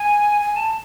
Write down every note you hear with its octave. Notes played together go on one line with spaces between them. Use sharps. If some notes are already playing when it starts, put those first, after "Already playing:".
Already playing: G#5
G#5
A5